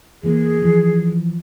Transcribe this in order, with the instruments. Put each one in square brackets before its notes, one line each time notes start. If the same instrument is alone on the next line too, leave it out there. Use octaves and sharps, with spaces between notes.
[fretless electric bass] E2 E3 A#3 [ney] G#4
[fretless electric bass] E3 F3